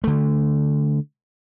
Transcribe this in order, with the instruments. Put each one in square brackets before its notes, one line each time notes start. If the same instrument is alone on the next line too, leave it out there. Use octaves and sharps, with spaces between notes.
[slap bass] D3 A3